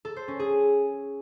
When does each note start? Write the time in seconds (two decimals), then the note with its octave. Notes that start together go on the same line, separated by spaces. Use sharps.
0.05 A4
0.16 C5
0.28 C#4
0.39 G#4